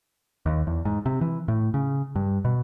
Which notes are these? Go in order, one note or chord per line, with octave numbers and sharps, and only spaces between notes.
D#2
E2
G#2
C3
E3
A2
C#3
G2
B2